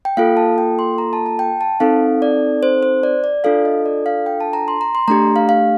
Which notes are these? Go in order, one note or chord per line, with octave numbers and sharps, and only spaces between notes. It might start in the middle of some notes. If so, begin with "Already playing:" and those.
G5
A#3 F4 A4 F5
A5
G5
C6
A#5
A5
A5
G5
A5
C4 D#4 A4 F5
D5
C5
C5
D5
D5
D4 F4 A4 F5
D#5
D5
F5
G5
A5
A#5
C6
A#5
C6
A3 D4 G4 A#5
F5
F5